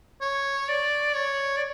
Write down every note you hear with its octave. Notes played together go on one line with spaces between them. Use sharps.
C#5
D5
C#5
D5